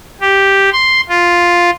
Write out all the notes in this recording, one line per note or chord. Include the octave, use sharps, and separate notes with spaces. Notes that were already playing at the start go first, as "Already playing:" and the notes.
G4
C6
F4